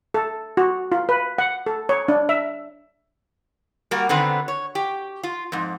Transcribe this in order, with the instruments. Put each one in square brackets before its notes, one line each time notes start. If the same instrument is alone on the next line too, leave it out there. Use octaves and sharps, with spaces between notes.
[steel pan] A4
F#4
F4
B4
F#5
A4
C#5
D4
E5
[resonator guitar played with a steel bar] G3 A#3 F#4 A#4
D3 D#3 B3 C4 B4
C#5
G4
F4
F2 G#2